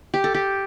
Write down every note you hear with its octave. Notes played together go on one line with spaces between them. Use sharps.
G4
A4
G4